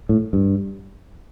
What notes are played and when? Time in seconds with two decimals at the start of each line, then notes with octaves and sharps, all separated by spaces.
0.09 A2
0.33 G2